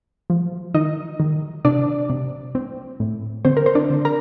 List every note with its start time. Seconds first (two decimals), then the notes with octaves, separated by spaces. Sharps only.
0.30 F3
0.74 D#3 D#4 D#5
1.20 D#3
1.65 C3 D4 D5
2.10 C3
2.55 C4
3.00 A2
3.45 D3 C4 C5
3.57 A#4
3.66 C5
3.75 D4 D5
3.90 D3
4.05 A#4 A#5